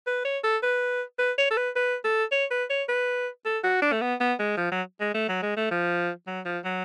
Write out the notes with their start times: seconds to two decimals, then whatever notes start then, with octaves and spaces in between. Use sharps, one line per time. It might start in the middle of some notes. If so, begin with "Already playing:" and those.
0.07 B4
0.25 C#5
0.44 A4
0.63 B4
1.19 B4
1.38 C#5
1.51 A4
1.57 B4
1.76 B4
2.04 A4
2.32 C#5
2.51 B4
2.70 C#5
2.89 B4
3.45 A4
3.64 F#4
3.82 D4
3.92 A3
4.01 B3
4.20 B3
4.39 G#3
4.57 F3
4.72 F#3
5.01 G#3
5.14 A3
5.29 F#3
5.42 G#3
5.57 A3
5.71 F3
6.27 F#3
6.45 F3
6.65 F#3